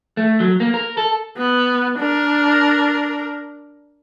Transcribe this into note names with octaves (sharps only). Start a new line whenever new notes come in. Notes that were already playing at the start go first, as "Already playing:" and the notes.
A3
F#3
A#3
A#4
A4
B3
D4 A#4